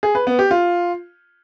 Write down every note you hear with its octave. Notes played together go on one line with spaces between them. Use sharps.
G#4
B4
B3
G4
F4